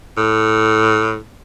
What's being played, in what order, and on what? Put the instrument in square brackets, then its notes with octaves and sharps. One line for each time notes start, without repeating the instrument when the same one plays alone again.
[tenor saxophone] A2